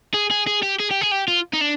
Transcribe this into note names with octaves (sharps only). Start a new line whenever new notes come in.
G#4
G#4
G#4
G4
G#4
G4
G#4
G4
F4
D#4
D4